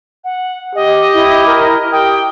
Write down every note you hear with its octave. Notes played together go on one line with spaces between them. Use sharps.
F#5
G4 D#5
E4
A#4
G4 G5 D#6